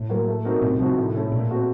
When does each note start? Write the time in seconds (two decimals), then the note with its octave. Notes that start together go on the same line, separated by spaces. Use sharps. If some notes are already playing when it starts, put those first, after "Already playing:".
Already playing: A2
0.09 F#3 A#3
0.28 A3
0.45 C4 D#4 F#4 A#4
0.62 A2 C3
0.79 C3 F3 C4 D#4 F#4
0.97 A2
1.15 A3 C#4 A4
1.32 A#2 A3
1.50 C4 F#4 A4